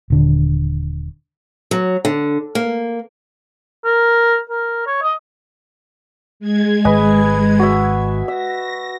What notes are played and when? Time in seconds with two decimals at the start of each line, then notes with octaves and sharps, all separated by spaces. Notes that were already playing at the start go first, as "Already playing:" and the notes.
0.10 D#1 D3
1.71 F#3
2.05 D3
2.55 A#3
3.85 A#4
4.50 A#4
4.87 C#5
5.02 D#5
6.40 G#3 G#6
6.85 G#1 B4 D#5 G#5
7.59 F#4 E5
8.28 E5 A#6